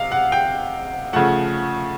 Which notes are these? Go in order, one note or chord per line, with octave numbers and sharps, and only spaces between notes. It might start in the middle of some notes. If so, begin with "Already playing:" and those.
Already playing: C3 F5
F#5
G5
C#3 F3 A3 F#5